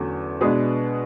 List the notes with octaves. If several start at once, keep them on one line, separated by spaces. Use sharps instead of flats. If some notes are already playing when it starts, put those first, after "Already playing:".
Already playing: E2 D3 F#3 A3 C#4
B2 G#3 B3 D4 G#4 B4